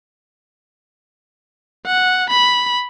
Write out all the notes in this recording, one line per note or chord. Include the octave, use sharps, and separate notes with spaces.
F#5
B5